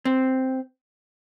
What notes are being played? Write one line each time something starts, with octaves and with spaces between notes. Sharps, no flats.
C4